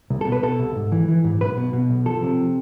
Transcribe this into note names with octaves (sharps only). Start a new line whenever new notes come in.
C2
A4
B2
B4
B2 A4
C2
G#2
E3
E3
G#2
B1 B4
B2
B2
B1
F3 A4
C3